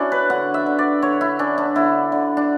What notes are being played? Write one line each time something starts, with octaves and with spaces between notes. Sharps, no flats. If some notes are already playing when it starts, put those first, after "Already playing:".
Already playing: C#4 D4 E4 F#4
B4
D3 F#5
E5
D3
D5
D3 C#5
E4
C#4 D4
D4
D3 E4
D3
D4